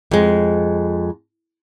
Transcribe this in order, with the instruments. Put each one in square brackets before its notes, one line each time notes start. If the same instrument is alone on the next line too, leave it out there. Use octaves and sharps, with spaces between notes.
[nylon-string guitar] F2 G#3